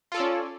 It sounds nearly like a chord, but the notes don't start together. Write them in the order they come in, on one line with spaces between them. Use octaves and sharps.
F4 A4 D5 C#4